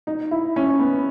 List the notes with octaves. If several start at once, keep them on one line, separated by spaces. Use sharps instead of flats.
D#4
E4
C#4
B3